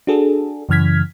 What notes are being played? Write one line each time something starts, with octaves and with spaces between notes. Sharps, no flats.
D4 F#4 G#4 A4
F#2 C#3 E3 F6 G#6 B6